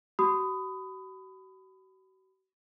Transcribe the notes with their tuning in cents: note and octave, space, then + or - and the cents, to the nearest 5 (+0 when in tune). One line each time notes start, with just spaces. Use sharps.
F#4 +40 B5 +25 D#6 +0